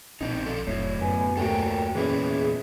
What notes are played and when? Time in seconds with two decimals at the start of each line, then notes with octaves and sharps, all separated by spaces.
0.21 A#1 B2 C4 D#4
0.46 F3 G3 A4
0.67 F1 A2 F#3 C#5
1.01 F#2 B3 G#5
1.37 D#1 A2 F#4 A4 A#4 C#5 G5
1.95 E2 A#2 C#4 E4 G#4 B4